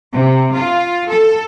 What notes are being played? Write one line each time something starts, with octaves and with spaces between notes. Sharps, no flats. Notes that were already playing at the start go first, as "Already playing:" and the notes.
C3
F4
A4